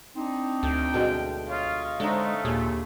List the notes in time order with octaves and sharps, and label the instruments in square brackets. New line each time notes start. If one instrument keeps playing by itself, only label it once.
[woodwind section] C4 D4 D#4
[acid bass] D2 [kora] A4 [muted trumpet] G5
[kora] B2 D3 G#3
[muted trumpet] F4 [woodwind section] C#5 D#5 F5
[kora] D3 C4 D#4 [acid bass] G#3 [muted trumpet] A3
[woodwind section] D#2 [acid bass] A#2 [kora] G#4